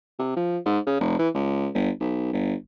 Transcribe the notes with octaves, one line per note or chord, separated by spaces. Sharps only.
C3
F3
G#2
C#3
F1
E3
C#2
G1
B1
G1